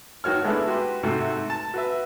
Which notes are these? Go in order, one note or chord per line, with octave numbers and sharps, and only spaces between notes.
G#1 D#3 F#4 C#5 F6
G#3 A3 B3 D4 E4
F#4 G4 B4 C6
G#2 C3 A3 F#4
A5
F#4 B4 E5